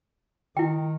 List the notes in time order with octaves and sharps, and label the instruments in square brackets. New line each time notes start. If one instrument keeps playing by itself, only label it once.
[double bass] D#3 [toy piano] E4 G5